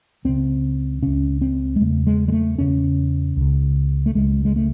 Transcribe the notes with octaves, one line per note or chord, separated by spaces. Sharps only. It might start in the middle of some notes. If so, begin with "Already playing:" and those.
C#2 C#3 C4
C#2 C#3 C#4
C4
G#3
E2 C#3 A3
G#3
G#3
A3
E2 C#3 C#4
C#2 C#3
A3
C#2 C#3 G#3
G#3
A3